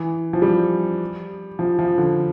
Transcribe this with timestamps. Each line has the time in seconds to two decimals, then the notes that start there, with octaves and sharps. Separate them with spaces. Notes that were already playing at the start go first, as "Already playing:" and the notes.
Already playing: E3
0.33 F3
0.42 G3
1.59 F3
1.79 F3
1.98 D3